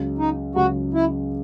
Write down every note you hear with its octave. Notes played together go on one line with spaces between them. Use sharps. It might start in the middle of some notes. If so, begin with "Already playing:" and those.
Already playing: C#2 C#3 F#3
D#4
C#2 C#3 F#3 F#4
E4